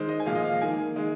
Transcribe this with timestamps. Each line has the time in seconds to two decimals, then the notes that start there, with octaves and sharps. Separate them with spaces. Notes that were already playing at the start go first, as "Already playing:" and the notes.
Already playing: D#3 G#3 C5
0.09 D#5
0.20 G#5
0.26 A#2 F3 G#3 F5
0.35 D#5
0.44 F5
0.61 D#3 A#3 G#5
0.96 D#3 G#3